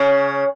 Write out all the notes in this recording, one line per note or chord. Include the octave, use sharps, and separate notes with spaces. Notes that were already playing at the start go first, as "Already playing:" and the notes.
Already playing: C#3 C#4